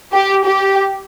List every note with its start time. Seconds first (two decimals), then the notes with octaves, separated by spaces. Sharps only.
0.13 G4
0.44 G4